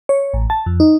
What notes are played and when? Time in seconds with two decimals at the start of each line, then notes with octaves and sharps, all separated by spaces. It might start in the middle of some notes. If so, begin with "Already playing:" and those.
0.09 C#5
0.34 A1
0.50 A5
0.66 F2
0.80 D#4